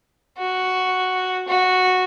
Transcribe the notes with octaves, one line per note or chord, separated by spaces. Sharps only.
F#4
F#4